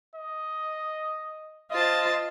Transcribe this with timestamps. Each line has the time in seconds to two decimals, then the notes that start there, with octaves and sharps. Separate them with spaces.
0.15 D#5
1.71 F4 C5 D#5 A5